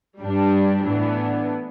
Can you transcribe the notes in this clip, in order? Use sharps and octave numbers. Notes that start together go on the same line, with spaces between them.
G2 G3 D4
A2 E3 B3 D4